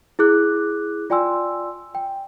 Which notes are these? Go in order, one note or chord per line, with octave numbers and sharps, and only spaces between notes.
E4 G#4 D6 F#6
F4 D5 G5 G#5 C6 E6
G5